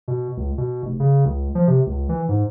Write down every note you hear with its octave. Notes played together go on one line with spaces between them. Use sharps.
B2
C#2
B2
F1
C#3
C#2
F3
C3
C#2
E3
G#2